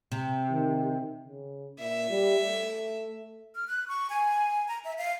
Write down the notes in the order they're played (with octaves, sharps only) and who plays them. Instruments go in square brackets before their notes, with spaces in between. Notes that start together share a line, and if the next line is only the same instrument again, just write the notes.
[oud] C3
[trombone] D#3
[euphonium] C#3
[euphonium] A#2 [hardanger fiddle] E5
[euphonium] G3
A3
[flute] F6
F#6
C#6
G#5
A#5
E5
F5